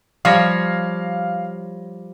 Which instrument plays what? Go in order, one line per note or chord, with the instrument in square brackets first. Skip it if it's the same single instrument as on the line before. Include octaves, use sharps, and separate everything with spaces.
[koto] F3 G3 C#5 [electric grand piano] F5 A#6